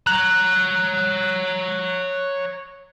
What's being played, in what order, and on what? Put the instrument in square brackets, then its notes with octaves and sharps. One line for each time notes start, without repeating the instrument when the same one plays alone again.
[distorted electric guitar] C#5 A#5 [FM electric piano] F#6